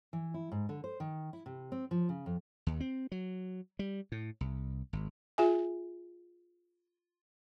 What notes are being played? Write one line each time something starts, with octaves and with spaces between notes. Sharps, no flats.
E3
E4
G#2
D3
C5
D#3
E4
C3
C4
F3
C#3
F2
D#2
C4
F#3
G3
A2
C2
G#1
F4 G#4 E5 G#5